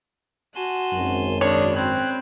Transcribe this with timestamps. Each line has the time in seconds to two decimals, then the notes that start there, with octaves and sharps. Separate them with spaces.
0.55 F#4 G#5 A5 C6
0.93 G#1 F#2
1.41 D#3 D4 G#4 C#5 B5
1.75 C4 B5 F#6 G#6